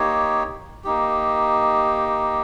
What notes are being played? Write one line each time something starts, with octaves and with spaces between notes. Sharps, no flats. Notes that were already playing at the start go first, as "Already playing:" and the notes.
Already playing: A#3 D#4 G4 C#5
A#3 D#4 G4